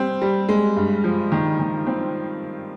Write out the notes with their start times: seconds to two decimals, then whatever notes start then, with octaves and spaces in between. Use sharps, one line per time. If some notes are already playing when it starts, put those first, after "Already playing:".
Already playing: G3 C4
0.22 G3
0.49 G#3
0.76 G2
1.04 F3
1.32 D#3
1.59 D#3
1.87 C4